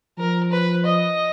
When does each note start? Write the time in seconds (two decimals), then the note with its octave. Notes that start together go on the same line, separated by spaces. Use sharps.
0.18 F3 A#4
0.51 B4
0.85 D#5